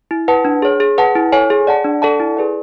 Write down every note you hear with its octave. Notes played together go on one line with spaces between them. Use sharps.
E4
B4 F#5 A5
D4
G#4 C#5
G#4
B4 F#5 A5
E4
A4 C#5 G#5
G#4
D5 F#5 A5
D4
A4 D5 F#5 A5
E4
G#4 B4 D5